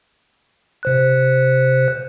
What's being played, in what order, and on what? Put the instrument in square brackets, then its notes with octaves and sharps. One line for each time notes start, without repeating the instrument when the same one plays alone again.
[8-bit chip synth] C3 C5 F#6